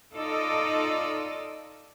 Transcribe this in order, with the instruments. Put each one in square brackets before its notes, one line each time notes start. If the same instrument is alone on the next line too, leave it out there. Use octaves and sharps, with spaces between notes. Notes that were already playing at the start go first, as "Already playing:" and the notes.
[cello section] D#4 F4 A4 D5 D#5